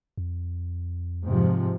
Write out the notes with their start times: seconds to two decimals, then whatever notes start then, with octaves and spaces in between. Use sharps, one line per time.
0.18 F2
1.25 G#2 C3 F3